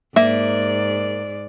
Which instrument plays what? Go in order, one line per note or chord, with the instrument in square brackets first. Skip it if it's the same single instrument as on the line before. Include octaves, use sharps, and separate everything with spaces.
[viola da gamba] G#2 D5 [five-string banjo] A#3 E5